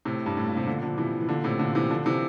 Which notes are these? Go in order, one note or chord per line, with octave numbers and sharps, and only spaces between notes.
A2 C3
G2
A2
A#2
C3
A#2 D3
D3 F3
C3 E3
E3
A#2 D3
A2 C3
A#2 D3
C3 E3
D3 F3
C3 E3